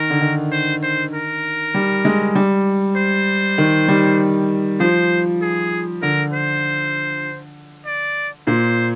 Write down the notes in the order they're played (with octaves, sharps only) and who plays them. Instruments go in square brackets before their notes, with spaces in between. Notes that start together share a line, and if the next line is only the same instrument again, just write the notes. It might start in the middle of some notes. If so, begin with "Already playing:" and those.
Already playing: [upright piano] D#3 [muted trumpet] A#4
[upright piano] D3
D#3
[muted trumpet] C5
C5
A#4
[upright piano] G3
G#3
G3
[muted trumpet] C5
[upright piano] D#3
G3
[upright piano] F3 [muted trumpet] C5
[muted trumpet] G#4
[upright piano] D3 [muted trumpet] A#4
[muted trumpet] C5
D5
[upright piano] A#2 [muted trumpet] C5